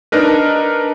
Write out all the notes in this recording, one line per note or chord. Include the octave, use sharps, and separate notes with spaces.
D4 D#4 A#4 B4